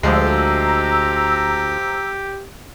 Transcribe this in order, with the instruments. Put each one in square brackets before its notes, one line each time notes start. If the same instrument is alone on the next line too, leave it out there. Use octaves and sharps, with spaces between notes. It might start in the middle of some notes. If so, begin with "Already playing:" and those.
[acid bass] D2 [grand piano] F3 G#3 [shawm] G4 [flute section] A#5 E6